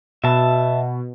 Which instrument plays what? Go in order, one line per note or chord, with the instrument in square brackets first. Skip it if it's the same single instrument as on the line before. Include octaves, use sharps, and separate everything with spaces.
[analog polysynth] B2 [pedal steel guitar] E5 A5